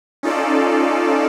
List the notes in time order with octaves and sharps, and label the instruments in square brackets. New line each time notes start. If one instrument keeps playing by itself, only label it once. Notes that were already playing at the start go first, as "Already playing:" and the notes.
[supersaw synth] C#4 D#4 F4 A4 D5